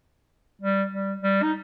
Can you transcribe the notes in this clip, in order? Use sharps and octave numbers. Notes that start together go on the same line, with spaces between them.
G3
G3
G3
D#4